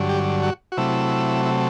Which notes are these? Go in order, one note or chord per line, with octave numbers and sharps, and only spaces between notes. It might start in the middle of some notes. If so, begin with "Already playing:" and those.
Already playing: G2 D3 F#3
G4
F#4
F#4
C3 F#3 A3 E4
E4